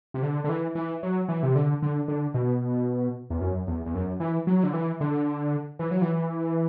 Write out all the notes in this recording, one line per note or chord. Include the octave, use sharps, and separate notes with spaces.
C3
D3
D3
E3
E3
F#3
E3
C3
D3
D3
D3
B2
E2
F#2
E2
E2
F#2
E3
F#3
D3
E3
D3
E3
F#3
E3